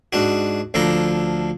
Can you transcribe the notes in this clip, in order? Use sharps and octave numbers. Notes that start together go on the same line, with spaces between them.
G#2 D4 F#4
D2 F3 D4 A4 A#5